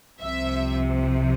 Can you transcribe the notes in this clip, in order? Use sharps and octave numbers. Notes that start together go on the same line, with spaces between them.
C2 C3 F3 E5